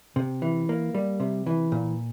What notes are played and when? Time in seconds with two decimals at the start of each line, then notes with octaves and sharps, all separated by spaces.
0.16 C3
0.42 E3
0.69 A#3
0.95 G3
1.20 C3
1.46 E3
1.72 A#2